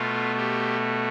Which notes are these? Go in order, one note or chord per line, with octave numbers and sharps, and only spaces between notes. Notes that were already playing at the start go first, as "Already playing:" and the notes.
Already playing: B2 A3 F4
G4